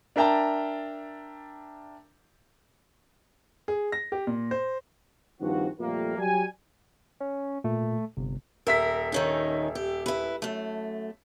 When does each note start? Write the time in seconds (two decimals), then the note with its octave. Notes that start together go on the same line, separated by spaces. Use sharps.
0.16 D4 A#4 E5 G5 A5 A#5
3.68 G#4
3.92 A#6
4.12 G4
4.27 A#2
4.51 C5
5.41 G2 D#3 F3 C4 F#4
5.80 F2 A#2 G3 A3 A#3
6.18 F#3 G3 G#5
7.20 C#4
7.64 A#2 A3
8.17 G1 C3
8.67 D#1 A#4 E5 B6
9.12 D#3 C#4 D#4
9.75 G4
10.06 E4 B4
10.42 F#2 A3